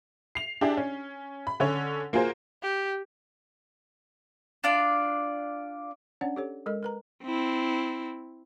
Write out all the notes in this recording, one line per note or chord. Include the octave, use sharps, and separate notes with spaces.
C7 F7
D4 E4 G4 G#4 D5
C#4
B5
D3 C#4 C#5
A#3 F4 F#4 G#4 A#4 C5
G4
D4 F4 D5
C#4 D4 C#5 D5 F#5
G4 A4 C#5
G#3 A4 A#4 D#5
A#4 B4 A#5
C4 E4